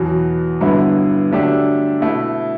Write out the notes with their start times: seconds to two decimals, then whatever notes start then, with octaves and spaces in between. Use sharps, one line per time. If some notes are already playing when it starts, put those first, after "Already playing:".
Already playing: E2 B2 F#3
0.61 G2 D3 F#3 B3 E4
1.31 D3 F#3 A3 D4 G4
2.01 B2 A3 E4